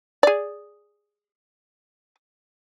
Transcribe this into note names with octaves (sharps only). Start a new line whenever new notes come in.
G#4 D5